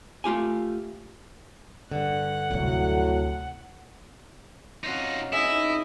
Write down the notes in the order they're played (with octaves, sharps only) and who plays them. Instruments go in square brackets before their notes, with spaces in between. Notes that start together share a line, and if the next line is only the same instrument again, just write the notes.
[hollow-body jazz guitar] A3 F4 G4 G#5
[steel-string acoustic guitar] G2 D3 [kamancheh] F#5
[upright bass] D2 C3 [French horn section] A2 F#3
[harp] C4 C#4 F#4 [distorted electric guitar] D#4 F4
[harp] D#4 G#4 [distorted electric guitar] E4 [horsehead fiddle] D#5 [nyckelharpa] E5